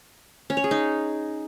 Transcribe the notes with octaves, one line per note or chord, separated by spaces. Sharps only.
C#4
C#5
G#4
D#4